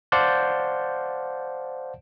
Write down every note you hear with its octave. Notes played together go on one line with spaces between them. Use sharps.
C5 D5 F5 F#5 A5 G6